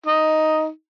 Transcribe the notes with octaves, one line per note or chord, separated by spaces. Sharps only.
D#4